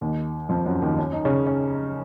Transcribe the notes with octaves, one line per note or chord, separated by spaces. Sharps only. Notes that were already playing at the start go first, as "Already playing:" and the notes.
D#2 D#3
F2 F3
F#2 F#3
D#2 D#3
C#4
D#4
C#3 C#4
C#4